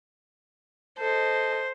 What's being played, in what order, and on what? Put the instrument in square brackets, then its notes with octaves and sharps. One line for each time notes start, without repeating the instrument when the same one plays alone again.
[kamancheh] A4 D#5 [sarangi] C5